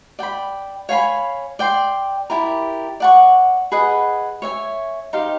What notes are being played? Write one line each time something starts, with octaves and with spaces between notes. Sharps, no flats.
D5 G5 B5
C#5 F5 G#5 B5
D5 G5 C6
E4 G4 A#4 D5
D5 F#5 A5 C#6
G#4 B4 D#5 F#5
C#5 E5 G#5
D#4 G4 C5 F5